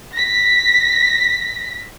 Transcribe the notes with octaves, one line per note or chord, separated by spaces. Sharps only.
A#6 B6